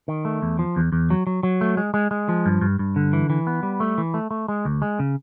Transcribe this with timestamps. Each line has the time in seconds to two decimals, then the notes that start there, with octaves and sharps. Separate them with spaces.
0.08 D#3
0.25 A3
0.42 E2
0.59 F3
0.76 E2
0.92 E2
1.10 F#3
1.27 F#3
1.43 F#3
1.61 A3
1.77 G#3
1.94 G#3
2.11 G#3
2.29 F3
2.46 G2
2.61 G2
2.79 G2
2.96 D3
3.13 E3
3.30 E3
3.47 B3
3.63 G3
3.80 A3
3.98 E3
4.14 A3
4.31 A3
4.48 G#3
4.65 D2
4.82 G#3
4.99 C#3